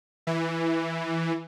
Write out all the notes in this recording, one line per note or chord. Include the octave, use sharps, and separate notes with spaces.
E3